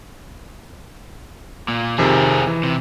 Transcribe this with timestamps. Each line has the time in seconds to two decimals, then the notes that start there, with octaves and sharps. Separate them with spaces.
1.68 A#2
1.98 F2 C3 D#3 C4 G#4
2.47 E3
2.63 C3